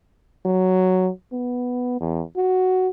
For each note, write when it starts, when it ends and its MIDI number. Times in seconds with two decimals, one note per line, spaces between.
0.45 1.10 54
1.32 1.97 59
2.00 2.22 40
2.36 2.88 66